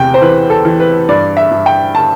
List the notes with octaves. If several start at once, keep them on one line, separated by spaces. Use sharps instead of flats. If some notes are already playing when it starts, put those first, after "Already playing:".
Already playing: E2 C3 G5
C5
E3 B4
A4
E3
B4
G2 D5
E5
G2
G5
A5